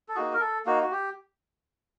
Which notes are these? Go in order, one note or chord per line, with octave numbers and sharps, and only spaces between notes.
A4
A#3 D#4 F#4 G#4
A#4
A4
A#3 D#4 F#4
F#4
G4